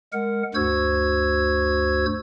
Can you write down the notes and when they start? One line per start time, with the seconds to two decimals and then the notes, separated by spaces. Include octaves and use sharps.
0.13 G#3 A#4 F#5
0.55 D2 G2 F#4 C5 E6 G#6